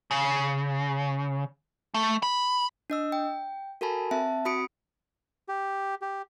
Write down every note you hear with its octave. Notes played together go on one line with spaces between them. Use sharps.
C#3
A3
B5
D4 D#5 E6
G5
F#4 A4 A#4 G#5 A5 B5
C4 E5 A5
C4 F#4 B5 D#6 C#7 D7
G4
G4